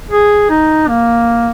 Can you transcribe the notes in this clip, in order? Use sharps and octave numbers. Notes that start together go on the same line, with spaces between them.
G#4
D#4
A#3